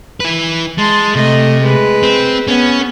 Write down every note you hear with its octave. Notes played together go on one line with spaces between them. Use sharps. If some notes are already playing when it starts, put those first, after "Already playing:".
E4 B4
G#3 A5 C6
C3 A3 D#5
G#3 B4
C4
B3 C#4